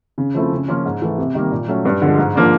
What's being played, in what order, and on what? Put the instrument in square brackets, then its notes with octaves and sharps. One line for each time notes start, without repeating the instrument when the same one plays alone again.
[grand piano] C#3
F3 A3 C4 E4
C#3
F3 A#3 C#4 F4
G#2
E3 A3
C3
D#3 G3 A#3
A#2
F#3 A3 C#4
G2
D3 F3 G#3
G#2
F3 A#3 D4